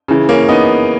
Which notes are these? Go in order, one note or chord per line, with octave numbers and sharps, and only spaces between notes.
C#3 E3
A#3 C#4
B3 D#4